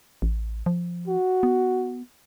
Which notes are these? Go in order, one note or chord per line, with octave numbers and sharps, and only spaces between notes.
A1
F3
F#4
B3